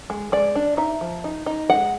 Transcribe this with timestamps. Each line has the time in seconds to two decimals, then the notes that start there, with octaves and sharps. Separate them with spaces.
0.10 G#3
0.32 G#3 D5
0.55 D4
0.77 D#4 E5
1.01 F3
1.24 D#4
1.46 D#4
1.70 G#3 F#5